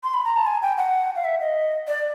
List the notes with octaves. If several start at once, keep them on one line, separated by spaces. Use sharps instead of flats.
C6
B5
A#5
A5
G#5
G5
F#5
F5
E5
D#5
D5